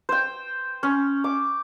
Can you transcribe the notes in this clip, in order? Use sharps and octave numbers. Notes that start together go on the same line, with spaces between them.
C5 G5
C#4
D6